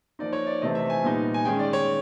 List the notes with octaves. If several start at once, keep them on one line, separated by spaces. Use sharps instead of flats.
F3 A#3 D#4 D5
C#5
D5
C3 E3 A3 C4 D#5
E5
G#5
A#2 G3 B3 D#4
G#5
D#3 G#3 C#4 G5
D5
C#5